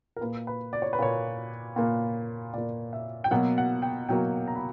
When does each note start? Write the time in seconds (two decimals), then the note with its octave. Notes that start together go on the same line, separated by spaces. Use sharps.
0.16 A#4
0.21 A#2 A#3 B4
0.47 B4
0.73 D5
0.82 C#5
0.93 B4
0.99 A#2 A#3 C#5
1.76 A#2 A#3
2.54 A#2 A#3 D5
2.93 E5
3.24 G5
3.31 B2 F#3 A#3 F#5
3.58 F#5
3.82 G5
4.08 B2 F#3 A#3 G5
4.48 A#5
4.55 B5